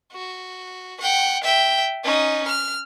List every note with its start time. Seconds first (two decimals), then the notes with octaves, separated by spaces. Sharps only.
0.13 F#4
1.01 F#5 G5
1.44 E5 G5
2.04 C#4 D#4
2.48 F6